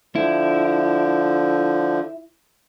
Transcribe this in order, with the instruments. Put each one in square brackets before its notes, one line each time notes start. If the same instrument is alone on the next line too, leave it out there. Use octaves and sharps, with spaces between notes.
[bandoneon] D3 F3 [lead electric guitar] E4